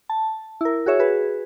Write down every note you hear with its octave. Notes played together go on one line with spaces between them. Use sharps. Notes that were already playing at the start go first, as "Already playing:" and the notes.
A5
E4 A#4
F#4 G#4 C#5 E5
F#4 G#4 B4